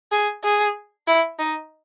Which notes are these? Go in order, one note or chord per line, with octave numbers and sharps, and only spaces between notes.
G#4
G#4
E4
D#4